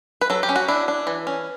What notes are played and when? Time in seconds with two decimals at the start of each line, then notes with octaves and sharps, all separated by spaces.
0.21 B4
0.30 F#3 A4
0.43 G4
0.49 C#4
0.56 F#4
0.68 D4 E4
0.88 D4
1.07 E3
1.27 C#4